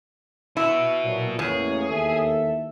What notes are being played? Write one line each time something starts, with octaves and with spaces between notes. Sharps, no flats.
E4 F#4 B4
A#2 F#3
A1 E2 A#3 G#4 C#5
D#2 A4 E5